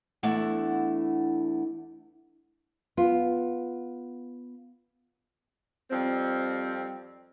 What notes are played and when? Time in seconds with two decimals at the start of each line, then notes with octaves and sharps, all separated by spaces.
0.23 E2 A3 D4 E4 F#5
2.97 B3 F4
5.91 F2 G3 C4